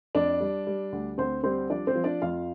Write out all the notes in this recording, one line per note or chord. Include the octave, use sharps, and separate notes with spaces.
F2 D4 D5
G3
G3
D2
D2 C4 C5
G3 C4 C5
F3 D4 D5
C4 C5
F3
D4 D5
F2 F4 F5